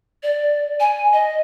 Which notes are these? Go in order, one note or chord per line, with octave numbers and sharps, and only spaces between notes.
D5
G#5
D#5